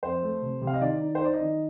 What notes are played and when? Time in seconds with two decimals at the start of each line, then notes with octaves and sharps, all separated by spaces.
0.03 F2 C5
0.22 A3
0.42 C3
0.62 C3
0.67 F5
0.74 D#5
0.81 D#3 D5
1.01 D#4
1.15 C5
1.21 D#4 D5
1.34 D#5
1.40 D#3